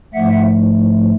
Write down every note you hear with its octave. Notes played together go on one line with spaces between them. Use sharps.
G#2 F3 A3 E5 F#5